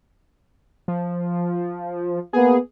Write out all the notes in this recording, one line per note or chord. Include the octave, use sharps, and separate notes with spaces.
F3
A#3 B3 G#4